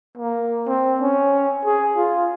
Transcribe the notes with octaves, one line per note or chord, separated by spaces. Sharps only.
A#3
C4
C#4
G#4
F4